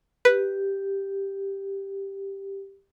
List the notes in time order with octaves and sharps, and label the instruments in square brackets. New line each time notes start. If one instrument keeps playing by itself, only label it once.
[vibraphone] G4 [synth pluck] B4